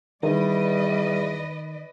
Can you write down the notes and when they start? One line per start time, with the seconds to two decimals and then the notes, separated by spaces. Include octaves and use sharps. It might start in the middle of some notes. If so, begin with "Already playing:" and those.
0.23 E2 D#3 G3 B4 D5 D#5